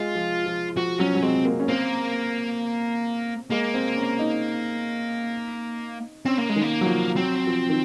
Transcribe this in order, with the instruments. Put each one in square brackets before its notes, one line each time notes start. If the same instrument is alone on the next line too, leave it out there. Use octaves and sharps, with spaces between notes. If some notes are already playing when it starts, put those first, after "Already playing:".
Already playing: [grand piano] G#3 [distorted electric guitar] F4
[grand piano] F3
F3
[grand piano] F3 [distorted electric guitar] F#4
[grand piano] F#3 [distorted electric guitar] C#4
[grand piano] F#3
[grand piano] G#3 [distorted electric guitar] C4
[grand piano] A#3
C#4
[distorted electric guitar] A#3 [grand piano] C4
[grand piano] G#3 [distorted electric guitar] A#3
[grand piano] C4
C#4
D#4
[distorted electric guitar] C4 [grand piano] C#4
[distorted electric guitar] A#3
G#3
[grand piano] D#3
[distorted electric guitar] A#3
[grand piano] F#3
F3
[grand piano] F#3 [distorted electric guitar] C4
[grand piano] F3
D#3